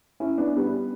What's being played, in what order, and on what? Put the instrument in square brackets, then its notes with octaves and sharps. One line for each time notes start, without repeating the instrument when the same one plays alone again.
[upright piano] C#4 E4
B3 D4
G3 B3